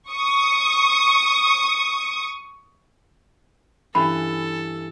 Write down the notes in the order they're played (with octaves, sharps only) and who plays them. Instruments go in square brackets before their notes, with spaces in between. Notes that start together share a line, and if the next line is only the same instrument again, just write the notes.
[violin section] C#6 D#6
[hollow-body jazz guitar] G2 E3 C#4 [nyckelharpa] A4 [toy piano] B5